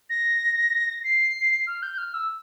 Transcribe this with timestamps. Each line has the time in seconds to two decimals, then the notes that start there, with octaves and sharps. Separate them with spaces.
0.09 A#6
1.03 C7
1.66 F6
1.82 G6
1.97 F6
2.13 E6